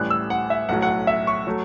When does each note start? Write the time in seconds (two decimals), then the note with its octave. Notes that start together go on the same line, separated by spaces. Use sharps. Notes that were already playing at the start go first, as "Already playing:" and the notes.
Already playing: A1 A2 G3 F#6
0.10 E6
0.30 F#5
0.50 E5
0.69 B1 A2 F#3 F#5
0.82 F#5
1.07 E5
1.27 C#6
1.47 F#3 A3